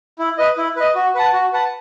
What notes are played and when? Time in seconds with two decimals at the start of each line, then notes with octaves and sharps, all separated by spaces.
0.19 E4
0.38 B4 D#5
0.58 E4
0.76 B4 D#5
0.95 F#4
1.15 B4 F#5 A5
1.33 F#4
1.53 B4 F#5 A5